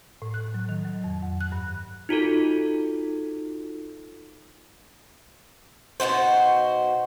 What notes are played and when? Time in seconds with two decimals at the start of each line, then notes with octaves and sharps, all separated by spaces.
0.22 A2
0.34 F#6
0.54 F#3
0.69 D#3
0.85 F#3
1.04 F2
1.22 F#5
1.41 F#6
1.52 G2
2.09 D#4 F4 F#4 A4
6.00 B2 D#4 F#4 C5